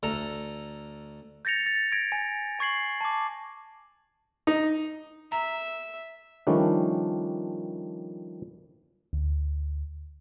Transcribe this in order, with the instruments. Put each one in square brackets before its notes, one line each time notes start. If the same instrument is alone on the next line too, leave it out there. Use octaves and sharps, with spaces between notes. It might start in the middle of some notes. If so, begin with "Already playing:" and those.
[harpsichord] D2 A4 A#5
[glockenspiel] G6 A6 A#6 C#7 F7
A6
G#6 A#6 D7
G#5
G#5 C#6 G#6 C7 F#7
A5 D6
[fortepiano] D#4
[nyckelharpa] E5 [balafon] A#5
[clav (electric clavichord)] D#3 F3 G3 A3 C#4 D4
[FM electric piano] D2